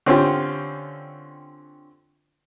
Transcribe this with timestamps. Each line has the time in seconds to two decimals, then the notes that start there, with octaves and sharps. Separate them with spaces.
0.06 D3 C4 C#4 F4 G4